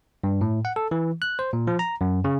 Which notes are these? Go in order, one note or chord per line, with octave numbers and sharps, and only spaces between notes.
G2
A2
F#5
A4
E3
F#6
C5
A#2
F3
A#5
F#2
C#3